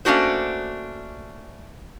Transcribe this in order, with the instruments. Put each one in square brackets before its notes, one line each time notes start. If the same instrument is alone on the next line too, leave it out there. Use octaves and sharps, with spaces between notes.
[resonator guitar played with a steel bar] A3 A#3 C#4 D4 F#4 C5